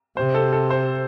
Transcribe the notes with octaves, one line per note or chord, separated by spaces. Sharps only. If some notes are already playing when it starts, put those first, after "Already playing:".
C3 C5
A4
A4
C5